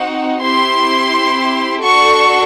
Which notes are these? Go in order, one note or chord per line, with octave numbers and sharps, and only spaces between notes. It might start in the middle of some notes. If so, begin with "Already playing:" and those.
Already playing: C4 D#4 F#4 F#5
C4 E4 G4 C6
D4 F#4 A4 C#6